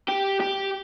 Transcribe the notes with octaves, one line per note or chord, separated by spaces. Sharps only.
G4
G4